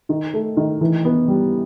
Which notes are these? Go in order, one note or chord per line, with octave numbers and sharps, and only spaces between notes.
D#3
A3
D#3
E3
B3
G3